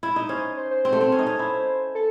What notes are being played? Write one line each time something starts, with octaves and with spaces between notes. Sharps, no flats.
E4
D#4
C#4 C5
C5
C5
C4
A3
C4
C#4
D#4
C#4
E4
A4